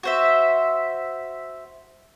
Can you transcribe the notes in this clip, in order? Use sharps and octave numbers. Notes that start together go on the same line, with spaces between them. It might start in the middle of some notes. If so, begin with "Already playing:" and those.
F#4 C5 E5